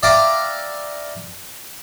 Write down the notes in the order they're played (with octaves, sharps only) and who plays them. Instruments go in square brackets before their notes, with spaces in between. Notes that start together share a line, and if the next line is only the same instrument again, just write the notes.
[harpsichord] D5 E5 F5 G5 A#5 D6